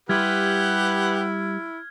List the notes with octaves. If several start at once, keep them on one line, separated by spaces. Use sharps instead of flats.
G3 E4 G4 B4 F#5 C6 F6 G#6